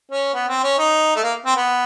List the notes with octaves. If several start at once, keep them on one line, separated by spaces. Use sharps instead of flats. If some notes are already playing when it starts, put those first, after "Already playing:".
C#4
B3
C4
C#4
D#4
A3
A#3
C4
B3